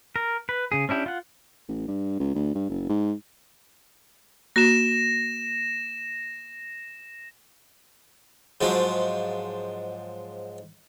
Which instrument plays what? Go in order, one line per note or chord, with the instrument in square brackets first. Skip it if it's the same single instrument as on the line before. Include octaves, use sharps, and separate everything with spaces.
[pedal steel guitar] A#4
B4
C#3 G#4
C#4 D4 E4 G4
F4 F#5
[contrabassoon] A1
G2
C#2
D2
G2
F#1
G#2
[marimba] A#3 F#4 [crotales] A#6 E7
[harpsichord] G#2 F3 F#3